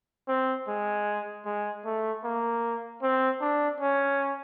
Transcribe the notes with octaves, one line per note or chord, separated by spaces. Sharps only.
C4
G#3
G#3
A3
A#3
C4
D4
C#4